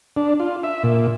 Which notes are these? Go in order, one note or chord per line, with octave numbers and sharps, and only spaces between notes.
D4
F4
E5
A#2